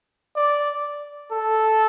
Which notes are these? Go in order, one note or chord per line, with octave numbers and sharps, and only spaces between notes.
D5
A4